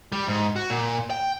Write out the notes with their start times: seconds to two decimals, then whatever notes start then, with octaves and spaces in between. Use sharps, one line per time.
0.12 G3
0.28 G#2
0.56 F#4
0.70 A#2
1.10 G5